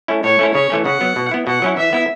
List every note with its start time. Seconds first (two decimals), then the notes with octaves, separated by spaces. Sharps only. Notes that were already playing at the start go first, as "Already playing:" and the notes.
0.08 A3 C#4 E4
0.24 A2 C#5
0.39 A3 C#4 E4
0.54 C#3 C#5
0.70 E3 A3 C#4
0.85 C#3 F#5
1.01 F#3 B3
1.16 B2
1.31 B3 E4
1.47 B2 F#5
1.62 F#3 C#4 E4
1.77 E3 E5
1.93 B3 E4